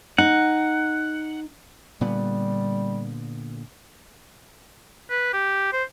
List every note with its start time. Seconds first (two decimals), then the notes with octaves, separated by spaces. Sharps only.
0.18 D#4 F#5
2.01 A#2 D3 G3 B3
5.10 B4
5.33 G4
5.73 C5